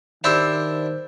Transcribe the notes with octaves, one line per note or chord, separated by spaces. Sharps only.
D#3 D4 E4 G4 C5 E6 F6